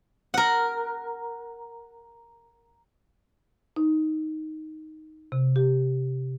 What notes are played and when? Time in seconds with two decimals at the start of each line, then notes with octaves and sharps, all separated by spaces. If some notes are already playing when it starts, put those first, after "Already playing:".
0.34 A#4 F#5
3.76 D#4
5.32 C3
5.56 G4